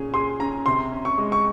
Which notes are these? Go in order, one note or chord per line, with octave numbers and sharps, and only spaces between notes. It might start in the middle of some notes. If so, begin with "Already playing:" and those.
Already playing: A#2 C#4 G#4
G#4 C6
C#4 A#5
C3 C6
C#4
C#6
G#3
C#6